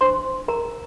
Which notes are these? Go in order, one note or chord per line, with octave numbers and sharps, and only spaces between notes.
D4 C5 C6
D4
A#4 A#5